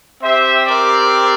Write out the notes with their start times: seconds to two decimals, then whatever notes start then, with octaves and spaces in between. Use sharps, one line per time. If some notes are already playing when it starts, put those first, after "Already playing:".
0.22 C4 G4 C5 E5
0.66 A#4 D5